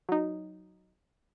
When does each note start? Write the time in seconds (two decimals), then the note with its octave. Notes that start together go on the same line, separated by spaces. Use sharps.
0.09 F#3 D#4